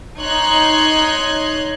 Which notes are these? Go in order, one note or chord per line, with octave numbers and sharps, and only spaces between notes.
D#4 C#5 C6 F#6 G#6